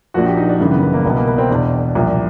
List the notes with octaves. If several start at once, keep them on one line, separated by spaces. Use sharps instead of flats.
A#1 A#2 F3 F#4
G4
D#4
D4
G#1 F#2 C#3 E3
B3
B3
A#3
C2 B2 B3
A#3
B3
C4
E2 B2 D4
C2 A#2 F3